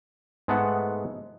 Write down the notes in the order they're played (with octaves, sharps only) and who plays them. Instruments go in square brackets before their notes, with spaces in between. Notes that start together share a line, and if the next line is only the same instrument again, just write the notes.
[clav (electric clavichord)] G#2 G#3 A3 B3 A4 F#5